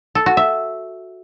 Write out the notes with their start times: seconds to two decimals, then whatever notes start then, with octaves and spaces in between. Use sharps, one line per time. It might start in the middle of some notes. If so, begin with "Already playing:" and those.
0.15 A4
0.26 F#4
0.37 E5